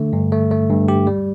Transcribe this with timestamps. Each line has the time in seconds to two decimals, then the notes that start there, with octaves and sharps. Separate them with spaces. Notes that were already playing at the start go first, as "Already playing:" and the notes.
Already playing: D3 A3
0.13 G2
0.32 A3
0.51 A3
0.70 G2
0.88 G4
1.07 G3